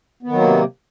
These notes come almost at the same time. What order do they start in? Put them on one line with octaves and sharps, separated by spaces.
B3 D#3 F#3 A#3 C3